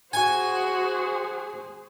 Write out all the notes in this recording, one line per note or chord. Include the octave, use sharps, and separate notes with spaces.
F#4 G#4 C5 G#5